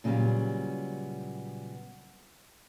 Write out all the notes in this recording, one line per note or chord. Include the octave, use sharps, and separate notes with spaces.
A#2 C#3 F#3 G3 B3